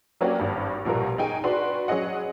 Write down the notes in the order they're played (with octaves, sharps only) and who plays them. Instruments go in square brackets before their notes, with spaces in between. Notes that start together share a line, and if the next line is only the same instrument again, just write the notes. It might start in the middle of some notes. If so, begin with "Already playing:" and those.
[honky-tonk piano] F#3 A#3 C#4 D4 F#4 G4
G#1 G2
A#1 B2 G3 F4 A#4
D#4 G#4 G5 G#5
D4 F#4 B4 C6
F#3 C#4 G#4 D#5 F#5